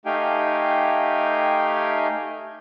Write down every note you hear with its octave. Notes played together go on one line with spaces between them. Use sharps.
A3 D#4 G4 F5 G5 G#5